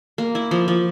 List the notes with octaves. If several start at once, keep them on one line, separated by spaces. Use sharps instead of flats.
A#3
E4
F3
F3